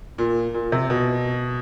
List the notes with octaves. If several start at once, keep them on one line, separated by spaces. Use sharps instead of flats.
A#2
A#2
C3
B2